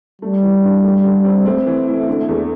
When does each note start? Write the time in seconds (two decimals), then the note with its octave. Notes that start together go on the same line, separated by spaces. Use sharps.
0.22 G3 A3
0.43 E3
0.64 D4
0.84 A3
1.04 D3
1.25 C4
1.46 A3 C4
1.66 E3
1.87 E4
2.08 D3
2.29 E2